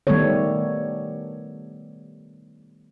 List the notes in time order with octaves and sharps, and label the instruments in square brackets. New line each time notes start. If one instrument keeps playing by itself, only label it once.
[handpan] D#3 G3 A3 B3 A4 C#5